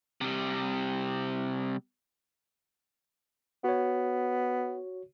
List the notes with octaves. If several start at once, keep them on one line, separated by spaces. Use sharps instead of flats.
C3 G3
B3 F#4 C#5